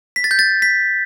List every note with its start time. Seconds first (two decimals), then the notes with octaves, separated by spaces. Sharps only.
0.16 B6
0.24 A6
0.31 G6
0.39 A6
0.62 B6